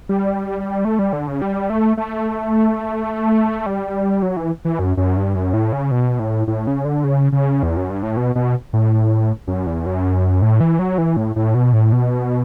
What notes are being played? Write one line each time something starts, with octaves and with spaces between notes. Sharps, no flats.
G3
A3
G3
D3
C#3
G3
A3
A3
G3
F#3
E3
E3
F#2
F#2
G2
F#2
A2
C#3
B2
A2
A2
C#3
D3
C#3
C#3
E2
F#2
G2
A2
B2
B2
A2
F#2
E2
F#2
A2
E3
F#3
E3
A2
A2
B2
A2
B2